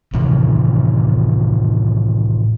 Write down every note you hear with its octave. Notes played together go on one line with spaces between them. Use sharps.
A2 C3 D#3 E3